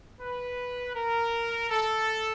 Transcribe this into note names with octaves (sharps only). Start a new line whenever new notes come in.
B4
A#4
A4